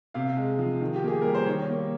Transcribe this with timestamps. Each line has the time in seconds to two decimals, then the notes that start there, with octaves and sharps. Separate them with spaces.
0.14 C3 F5
0.37 G#3
0.59 F3
0.81 D#3
0.96 G4
1.03 A#3 G#4
1.22 G3 A#4
1.35 C5
1.46 D#3 C#5
1.69 A#3